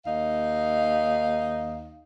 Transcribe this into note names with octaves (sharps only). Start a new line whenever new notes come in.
D#2 D#4 F5